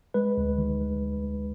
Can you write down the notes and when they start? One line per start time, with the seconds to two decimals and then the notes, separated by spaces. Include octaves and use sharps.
0.14 G#3 B4
0.37 D2
0.58 D#3